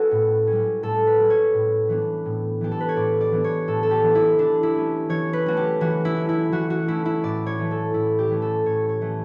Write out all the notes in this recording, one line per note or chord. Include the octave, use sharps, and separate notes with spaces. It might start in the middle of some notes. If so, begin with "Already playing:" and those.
Already playing: C#4 F#4 A4 B4
A2
G3 C#4
A2 A4
B4
G3 C#4
C#5
A2
E3 B3 D4
A2
E3 B3 D4 G4
A4
B4
C#5
A2 D5
D5
E3 B3 D4
C#5
A2 A4
A4
G4
E3 B3 D4
E4
E3 D4
E4
A3 C#4
E3 C#5
B4
A3 C#4 F#4
G4
E3 F#4
E4
A3 C#4
E4
E3 F#4
F#4
A3 C#4 E4
E4
A2 D5
C#5
E3 A3 C#4
A4
A2 E4
G4
E3 A3 C#4
A4
A2 C#5
C#5
E3 A3 C#4